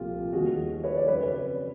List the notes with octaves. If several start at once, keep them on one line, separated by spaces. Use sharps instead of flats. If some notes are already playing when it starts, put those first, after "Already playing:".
Already playing: C2 A#2 F3 A3 F4 G4
D#2 D#3 G3 F#4 G#4
B4 C#5
D5
F2 C#3 F#3 B4 C#5
B4